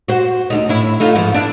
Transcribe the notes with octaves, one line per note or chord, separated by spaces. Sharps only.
F#4 C5
D2 D#4
A2 E4
A3 D#4 F4
G#2 E3 F3
D4 E4